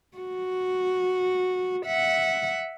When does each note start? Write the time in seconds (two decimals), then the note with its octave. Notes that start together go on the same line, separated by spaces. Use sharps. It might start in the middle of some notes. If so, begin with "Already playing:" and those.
0.18 F#4
1.86 E5 F#5